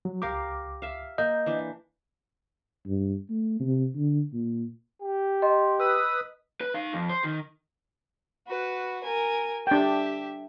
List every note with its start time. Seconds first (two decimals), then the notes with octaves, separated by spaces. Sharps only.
0.05 F#3
0.22 C#2 G4 A#4 F5 D6
0.82 E5 F5
1.18 A#3 D#5 G6
1.46 E3 D4
2.85 G2
3.30 A3
3.60 C3
3.96 D3
4.33 A#2
5.02 G4
5.42 D#5 A#5 C6
5.80 B4 D#6 E6
6.61 B4
6.74 D#4 F5
6.94 F2
7.10 C5
7.24 D#3
8.47 F#4 B4
9.03 A#4 G#5
9.67 D4 G4 E5 G5